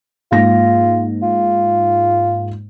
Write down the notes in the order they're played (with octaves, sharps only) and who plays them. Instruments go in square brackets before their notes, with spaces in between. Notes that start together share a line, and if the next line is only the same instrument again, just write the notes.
[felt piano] G#2 A#3 A#6 [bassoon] F4
[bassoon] F4